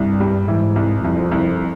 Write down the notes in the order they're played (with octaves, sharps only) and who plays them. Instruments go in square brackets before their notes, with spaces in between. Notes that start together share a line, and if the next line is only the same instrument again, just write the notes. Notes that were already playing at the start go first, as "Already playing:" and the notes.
Already playing: [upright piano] C2 [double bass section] G2
[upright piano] G3
[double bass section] G#2 [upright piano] E3
[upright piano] C2
[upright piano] C2 [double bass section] F2
[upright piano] C2